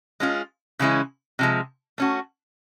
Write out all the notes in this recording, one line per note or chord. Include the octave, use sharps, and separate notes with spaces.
G#3 C#4 F4
C#3 E3 G#3 C#4 E4
C3 F3 G#3
A3 C#4 F#4